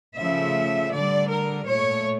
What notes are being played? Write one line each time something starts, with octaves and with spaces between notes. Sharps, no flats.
C#3 F3 A3 E5
D3 G3 D5
A#4
A#2 A3 C#5